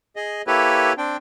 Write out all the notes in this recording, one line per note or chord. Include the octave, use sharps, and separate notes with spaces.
G#4 D#5
A#3 E4 G4 A4 B4 C#5
C4 D4 G5